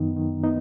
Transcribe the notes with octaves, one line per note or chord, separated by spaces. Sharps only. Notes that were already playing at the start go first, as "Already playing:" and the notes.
Already playing: F#2 D#3 B3 D#4
D#3
B3 D#4